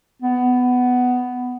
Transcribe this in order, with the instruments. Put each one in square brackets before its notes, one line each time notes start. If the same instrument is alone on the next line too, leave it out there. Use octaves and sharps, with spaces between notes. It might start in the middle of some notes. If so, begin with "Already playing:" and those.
[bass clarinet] B3